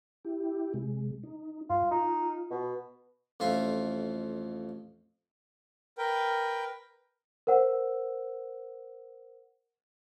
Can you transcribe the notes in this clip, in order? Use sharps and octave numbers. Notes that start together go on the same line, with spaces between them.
E4 G4
C3 G#3
D#4
G2 F4
D#4 F4
B2
A1 F2 F4 E5
A#4 B4 G5
A#4 C5 F#5 E6